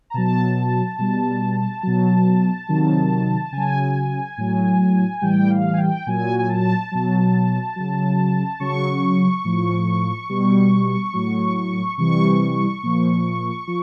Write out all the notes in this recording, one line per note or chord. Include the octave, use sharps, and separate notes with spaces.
A#5
B2 F#3 A5
B2 G3
B2 F#3
C3 D#3 F#3
C#3 F#3 G#5
A2 F#3
A2 E3 G3 G5
F5
G#5
G5
A#2 F#3 G#5
G#5
A5
B2 F#3
C#3 F#3
C#3 F#3 C#6
A2 F3
B2 G3
A2 F#3
C3 E3 G3 C#6
A#2 F3
F3